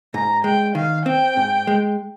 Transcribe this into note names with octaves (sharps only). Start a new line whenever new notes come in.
G#2 A#5
G#3 G5
D#3 F5
C4 G5
G#2
G#3